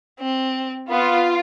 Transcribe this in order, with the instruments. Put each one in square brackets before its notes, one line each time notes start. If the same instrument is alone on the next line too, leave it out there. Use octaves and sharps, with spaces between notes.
[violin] C4
[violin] B3 [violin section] F4